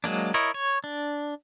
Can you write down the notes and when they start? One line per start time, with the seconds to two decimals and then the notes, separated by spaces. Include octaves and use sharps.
0.04 F#3 G#3 A#3 D4
0.34 E4 A#4 C#5 D#5
0.54 C#5
0.84 D4